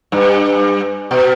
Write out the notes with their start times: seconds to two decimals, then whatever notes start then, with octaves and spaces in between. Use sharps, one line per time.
0.12 G2
1.11 B2